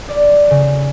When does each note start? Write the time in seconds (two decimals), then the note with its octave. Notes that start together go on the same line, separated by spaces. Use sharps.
0.09 D5
0.51 C#3